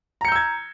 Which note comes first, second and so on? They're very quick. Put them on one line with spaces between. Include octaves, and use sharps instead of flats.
A#5 C#7 G6 E6 G#6